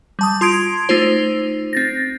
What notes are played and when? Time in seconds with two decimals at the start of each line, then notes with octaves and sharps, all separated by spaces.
0.19 G3 A5 D#6
0.41 F4 C6 D#6 G#6 D7
0.89 A3 D#4 F4 C5
1.73 C4 A6 A#6